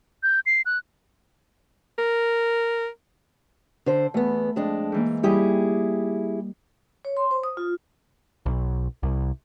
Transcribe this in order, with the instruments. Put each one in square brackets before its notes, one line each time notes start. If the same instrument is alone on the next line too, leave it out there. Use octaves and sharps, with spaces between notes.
[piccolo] G6
C7
F#6
[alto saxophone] A#4
[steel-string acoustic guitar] D3 C5
[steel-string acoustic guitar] E2 B3 [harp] A3
[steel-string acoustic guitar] F2 G#3 D4
[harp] G#2 E3 A#3
[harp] G3 D#6 [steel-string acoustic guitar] E4 G4 G#4
[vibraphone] C#5
C6
C5
D#6
F4
[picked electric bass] B1
C2